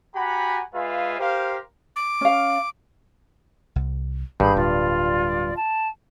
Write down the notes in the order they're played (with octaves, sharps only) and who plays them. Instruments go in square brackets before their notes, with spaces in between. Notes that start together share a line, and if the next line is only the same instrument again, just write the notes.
[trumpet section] F#4 G4 F#5 G#5 A#5 B5
G#3 F4 B4 E5 F5 G#5
G4 A#4 C5 F5
[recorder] D6
[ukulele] C#4 F5
[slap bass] C2
[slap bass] G#1 [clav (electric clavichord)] G2 [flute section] G#4 B5 G6
[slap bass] D1 G3 [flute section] F4 D5
[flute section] A5